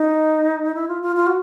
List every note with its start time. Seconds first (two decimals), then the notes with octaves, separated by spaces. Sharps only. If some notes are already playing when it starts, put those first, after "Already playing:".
Already playing: D#4
0.75 E4
0.88 F4
1.02 F4
1.16 F4
1.27 F#4